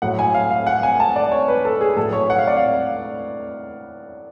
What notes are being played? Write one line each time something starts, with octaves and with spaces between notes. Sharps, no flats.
A2 F#3 F#5
G#5
F5
F5
F#5
G#5
A5
D5
C#5
B4
A4
G#4
A2 F#3 A4
C#5
F#5
F5
D5
F5